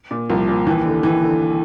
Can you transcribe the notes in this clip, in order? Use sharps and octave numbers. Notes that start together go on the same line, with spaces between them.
A#2
C2 F3
A#2
D#2 E3
D3
D#2 E3
D3